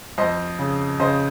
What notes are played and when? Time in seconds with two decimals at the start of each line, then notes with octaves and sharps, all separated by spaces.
0.18 F2 C5 D#5
0.59 C#3
1.00 C#3 C5 D#5